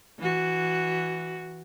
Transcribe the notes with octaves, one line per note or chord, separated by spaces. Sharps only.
E3 F#4